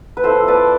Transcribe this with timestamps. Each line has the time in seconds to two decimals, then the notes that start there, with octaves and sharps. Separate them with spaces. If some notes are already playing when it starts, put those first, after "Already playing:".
0.17 B4
0.24 F3 C4 E4 A4 C5
0.48 B4 D5